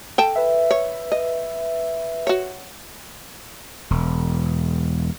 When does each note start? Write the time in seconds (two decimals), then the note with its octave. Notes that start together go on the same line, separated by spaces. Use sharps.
0.18 A4 G5 A5
0.36 B4 E5
0.71 C#5
1.12 D#5
2.27 F#4 C#5
3.91 E1